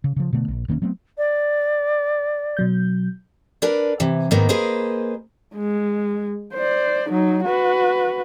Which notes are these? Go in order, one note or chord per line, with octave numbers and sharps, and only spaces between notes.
C#3
C#3 F3
B2 D3 A3 B3
A#1
E1 D#3 A#3 C#4
F#3 A3 B3 C4
D5
B2 F#3 G6
D4 A#4 B4 D5
C3 E3
G#2 D#3 A#3 B3
A#3 G#4 B4 C5 D#5
G#3
C5 D5
F#3 D#4
F#4 B4